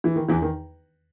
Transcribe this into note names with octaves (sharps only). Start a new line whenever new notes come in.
E3
D#3
E2 E3
D#3